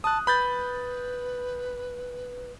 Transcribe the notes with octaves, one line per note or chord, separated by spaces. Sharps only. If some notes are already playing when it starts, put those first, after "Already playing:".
A5 D#6 F#6
B4 B5 G6 A6